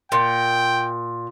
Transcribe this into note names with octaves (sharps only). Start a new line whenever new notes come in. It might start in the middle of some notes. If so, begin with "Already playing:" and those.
A#2 G5